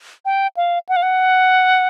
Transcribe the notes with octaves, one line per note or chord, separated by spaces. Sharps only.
G5
F5
F#5
F5
F#5